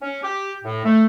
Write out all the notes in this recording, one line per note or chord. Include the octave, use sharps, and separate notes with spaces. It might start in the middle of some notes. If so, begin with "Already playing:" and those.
C#4
G4
A2
A3